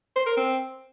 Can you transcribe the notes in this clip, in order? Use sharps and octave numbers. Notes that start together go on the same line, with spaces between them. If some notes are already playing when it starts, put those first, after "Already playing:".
C5
A#4
C4